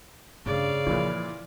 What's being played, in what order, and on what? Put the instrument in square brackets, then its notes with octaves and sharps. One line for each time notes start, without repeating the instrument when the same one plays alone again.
[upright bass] G2 A3 [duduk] C#3 [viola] D5 F5
[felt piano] A#2 E3 [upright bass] F3